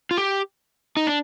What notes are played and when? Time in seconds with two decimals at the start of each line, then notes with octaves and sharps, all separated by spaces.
0.11 F4
0.17 G4
0.97 D#4
1.07 D4